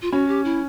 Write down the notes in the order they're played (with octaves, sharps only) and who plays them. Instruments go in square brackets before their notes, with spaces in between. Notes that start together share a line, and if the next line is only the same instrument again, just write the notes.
[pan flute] F4
[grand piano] C#4 [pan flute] F#4
[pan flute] G4
E4